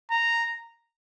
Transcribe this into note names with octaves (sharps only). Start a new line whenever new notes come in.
A#5